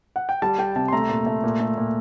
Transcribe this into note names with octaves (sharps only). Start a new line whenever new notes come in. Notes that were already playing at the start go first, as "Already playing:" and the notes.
F#5
G5
G3 A5
G3 G5
C3 A5
C6
A3 A#5
A#2
A3
A#2
A3
A#2